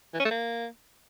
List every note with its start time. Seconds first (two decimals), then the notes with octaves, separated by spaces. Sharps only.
0.14 E3
0.20 C#4
0.25 A3
0.31 A#3